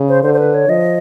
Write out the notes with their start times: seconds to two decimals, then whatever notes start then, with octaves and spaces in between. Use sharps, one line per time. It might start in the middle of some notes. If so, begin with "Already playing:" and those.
Already playing: C#3
0.09 C5
0.23 D3 C5
0.34 C5
0.39 B4
0.54 C#5
0.69 F3 D#5